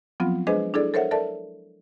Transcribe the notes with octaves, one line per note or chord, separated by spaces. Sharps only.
F3 F#3 B3 C4 F4
G#3 D4 G#4 B4 C5 D#5
D4 E4 G#4 A4 D5
A4 A#4 C5 C#5 E5 F#5
A4 A#4 D5 E5 A5